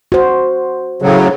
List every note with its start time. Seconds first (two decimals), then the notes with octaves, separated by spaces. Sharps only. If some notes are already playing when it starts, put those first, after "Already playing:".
0.12 F#4 C5
1.02 A2 C#3 F#3